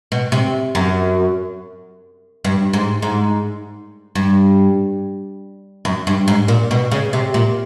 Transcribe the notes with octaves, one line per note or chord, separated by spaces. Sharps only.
B2
C3
F#2
G2
G#2
G#2
G2
F#2
G2
G#2
A#2
B2
C#3
C3
A#2